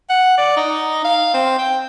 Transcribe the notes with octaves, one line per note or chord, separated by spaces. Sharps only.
F#5
D5
D#4
F5
C4
G5